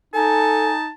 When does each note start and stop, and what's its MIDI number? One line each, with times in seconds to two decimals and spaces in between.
0.14 0.91 63
0.14 0.73 69
0.14 0.74 80
0.14 0.92 81